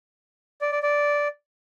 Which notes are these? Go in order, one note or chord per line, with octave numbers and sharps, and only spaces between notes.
D5
D5
D5